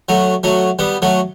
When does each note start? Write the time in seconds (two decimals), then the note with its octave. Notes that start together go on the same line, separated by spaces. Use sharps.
0.09 F#3 A3
0.43 F#3 A3
0.79 G3 B3
1.02 F#3 A3